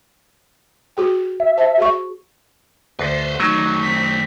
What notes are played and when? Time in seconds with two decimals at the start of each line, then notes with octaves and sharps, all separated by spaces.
0.97 F#4 G#4 G5
1.40 E5
1.57 C5 A5
1.78 F#4 G#4 C#6
2.99 D2 B4 C5
3.40 D#3 F#3 A3 D#4
3.83 C4 B6